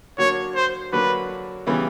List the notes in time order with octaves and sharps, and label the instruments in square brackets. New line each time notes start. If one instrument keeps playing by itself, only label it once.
[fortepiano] D3 F#3 A#3 D4 F#4 [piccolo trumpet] C#5
[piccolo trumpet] C5
[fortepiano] D3 F#3 A#3 D4 F#4 [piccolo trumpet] B4
[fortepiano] C#3 E3 G3 B3